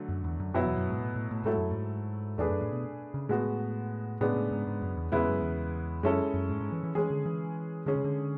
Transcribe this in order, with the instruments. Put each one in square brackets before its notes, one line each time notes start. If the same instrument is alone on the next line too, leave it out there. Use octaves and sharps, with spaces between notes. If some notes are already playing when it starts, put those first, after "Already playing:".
Already playing: [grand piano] D3 F#3 A3
[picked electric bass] F#2
E2
F#2
[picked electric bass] F#2 [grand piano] B2 F#3 B3 E4
[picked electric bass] E2
F#2
G#2
A2
A2
A2
[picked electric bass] G#2 [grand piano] F#3 A3 E4 A4
[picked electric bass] F#2
G#2
[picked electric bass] E2 [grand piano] A3 D4 G#4 B4
[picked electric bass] F#2
A2
B2
C#3
[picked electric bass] A2 [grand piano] G#3 B3 F#4
[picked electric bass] A2 [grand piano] C#3 G#3 B3 D4
[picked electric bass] A2
G#2
G#2
F#2
E2
[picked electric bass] E2 [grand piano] C#3 G#3 B3 E4 B4
[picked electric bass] F#2
E2
[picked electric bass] F#2 [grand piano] G#3 C#4 E4 A4
[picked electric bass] F#2
G#2
G#2
E3
E3
[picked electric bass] E3 [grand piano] G#3 C#4 G#4
[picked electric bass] D3
E3
[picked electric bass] D3 [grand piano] G#3 C#4 G#4
[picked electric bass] C#3
D3